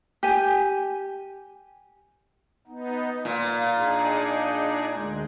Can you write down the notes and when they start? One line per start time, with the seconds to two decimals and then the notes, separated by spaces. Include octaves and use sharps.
0.23 G4 G#5
2.67 B3 D#4
3.25 A#2 F4
3.76 D4 D#4 G#4
4.92 D2 G#3